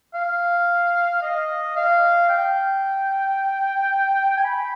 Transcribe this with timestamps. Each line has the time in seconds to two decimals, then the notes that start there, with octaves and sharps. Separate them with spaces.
0.14 F5
1.22 D#5
1.76 F5
2.29 G5
4.37 G#5
4.45 B5